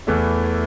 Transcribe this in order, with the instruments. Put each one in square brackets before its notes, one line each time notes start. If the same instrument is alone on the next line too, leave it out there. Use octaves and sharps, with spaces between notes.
[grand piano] E2 E3 A3 E4